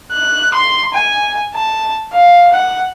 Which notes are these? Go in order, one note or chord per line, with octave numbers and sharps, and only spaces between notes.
F#6
C6
G#5
A5
F5
F#5